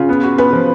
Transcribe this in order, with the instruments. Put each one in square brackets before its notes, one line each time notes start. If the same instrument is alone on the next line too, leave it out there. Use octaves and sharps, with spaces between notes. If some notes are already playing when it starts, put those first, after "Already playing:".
Already playing: [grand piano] C#3 [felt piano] F4
[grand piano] B3
F#4
[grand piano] B3 [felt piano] B4
[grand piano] F3